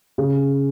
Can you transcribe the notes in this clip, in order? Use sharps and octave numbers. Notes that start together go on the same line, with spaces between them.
C#3